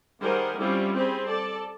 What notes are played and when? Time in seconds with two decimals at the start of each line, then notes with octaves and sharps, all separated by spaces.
0.22 D#3 G3 G#4 A#4 C5 F#5
0.58 G3 C4 C#4 E4 F4 G4
0.93 C4 G#4 B5
1.27 A4 D5 A5